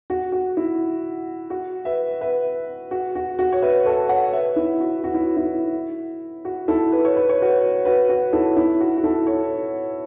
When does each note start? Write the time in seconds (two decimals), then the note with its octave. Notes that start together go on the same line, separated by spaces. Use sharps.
0.10 F#4
0.32 F#4
0.57 E4
1.50 F#4
1.85 B4 E5
2.21 B4 E5
2.91 F#4
3.15 F#4
3.39 F#4
3.52 C#5
3.62 B4 E5
3.86 A4 C#5
4.09 C#5 F#5
4.33 B4 E5
4.56 E4
4.80 F#4
5.04 F#4
5.14 E4
5.37 E4
6.45 F#4
6.68 E4 A4
6.92 B4
7.05 C#5
7.17 B4
7.29 C#5
7.42 F#4 B4
7.85 F#4 B4
8.09 F#4
8.33 E4 A4
8.57 E4
8.80 F#4
8.97 F#4
9.04 E4 A4
9.27 A4 C#5